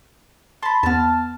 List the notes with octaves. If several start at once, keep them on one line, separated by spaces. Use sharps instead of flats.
A5 B5 C6
E2 B3 A5 F6